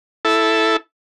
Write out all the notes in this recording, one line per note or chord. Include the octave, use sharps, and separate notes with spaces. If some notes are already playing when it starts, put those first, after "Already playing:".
E4 A4